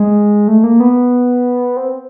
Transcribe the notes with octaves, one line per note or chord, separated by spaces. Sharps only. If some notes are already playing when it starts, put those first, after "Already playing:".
Already playing: G#3
A3
A#3
B3
C4